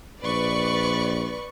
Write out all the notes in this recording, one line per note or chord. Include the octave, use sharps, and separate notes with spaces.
A#1 B4 D5 C#6